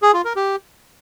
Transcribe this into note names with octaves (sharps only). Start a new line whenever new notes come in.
G#4
F4
A#4
G4